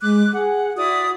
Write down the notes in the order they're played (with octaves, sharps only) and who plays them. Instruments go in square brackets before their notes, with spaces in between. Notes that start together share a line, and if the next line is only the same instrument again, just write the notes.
[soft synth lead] G#3 [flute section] D6 F#6
[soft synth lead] G#4 [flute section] F#5
[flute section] E4 D5 D#6 [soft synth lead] F#4